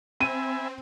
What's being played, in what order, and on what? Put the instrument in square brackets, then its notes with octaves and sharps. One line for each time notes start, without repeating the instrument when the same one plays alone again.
[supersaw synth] C4 [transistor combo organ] E5 G#5 B5 [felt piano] D#7